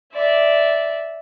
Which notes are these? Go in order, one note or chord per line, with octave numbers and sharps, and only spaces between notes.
D5 E5